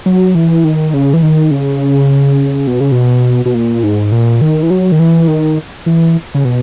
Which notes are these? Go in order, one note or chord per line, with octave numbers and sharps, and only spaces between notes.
F#3
E3
D#3
C#3
E3
D#3
C#3
B2
C#3
B2
B2
A#2
G#2
A#2
D#3
E3
F#3
D#3
E3
D#3
E3
C#3
B2